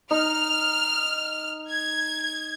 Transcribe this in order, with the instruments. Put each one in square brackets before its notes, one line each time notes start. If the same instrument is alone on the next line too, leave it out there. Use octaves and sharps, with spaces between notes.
[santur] D#4 [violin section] F6
[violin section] G#6